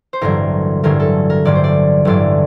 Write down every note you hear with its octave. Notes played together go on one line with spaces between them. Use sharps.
C5
A1 G2 D3 F#3 A#4
A1 G2 D3 F#3 A#4
A4
A#4
A1 G2 D3 F#3 D5
C5
D5
A1 G2 D3 F#3 D5